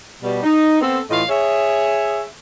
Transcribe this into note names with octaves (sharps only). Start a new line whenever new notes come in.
B2 G3
D#4
B3 C4 A4
A2 E3 A3 F4 D#5 F5
G#4 C#5 E5